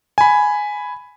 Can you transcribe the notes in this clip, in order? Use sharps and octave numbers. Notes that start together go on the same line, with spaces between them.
G#5 B5